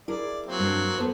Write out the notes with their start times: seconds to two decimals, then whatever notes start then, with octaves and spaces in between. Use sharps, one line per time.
0.08 E4 G#4 A#4 D5
0.46 F#3 A#3 C4
0.59 G2
0.98 B3 A4 C5